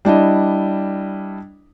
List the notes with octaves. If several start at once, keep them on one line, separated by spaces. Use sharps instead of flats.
G3 D4 E4 D#5